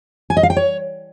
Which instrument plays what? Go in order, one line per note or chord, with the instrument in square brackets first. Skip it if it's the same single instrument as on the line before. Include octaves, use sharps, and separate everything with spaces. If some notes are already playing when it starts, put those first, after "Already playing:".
[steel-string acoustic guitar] G#5
D#5
F5
G5
C#5